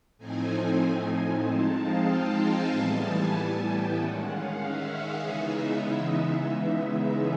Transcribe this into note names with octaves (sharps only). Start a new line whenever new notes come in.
A2 F3 A3 C4 D#4 G#5
F3 G#3 C4 D#4 A5
F5
G5
G#5
A2 E3 G3 B3 A5
G#5
G#5
G5
D#3 G#3 C#4 F#5
F5
E5
E5
C#3 E3 G#3 B3 D#4